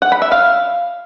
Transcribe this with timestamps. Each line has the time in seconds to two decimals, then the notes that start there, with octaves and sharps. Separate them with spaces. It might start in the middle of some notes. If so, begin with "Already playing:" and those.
0.02 F#5
0.12 B5
0.22 E5
0.32 F5